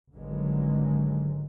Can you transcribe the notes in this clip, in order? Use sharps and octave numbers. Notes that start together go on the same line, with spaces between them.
G#1 G2 D3 D#3 F#3 G#3